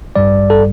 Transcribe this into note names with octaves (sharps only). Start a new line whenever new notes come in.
A1 G2 G3 D5
A4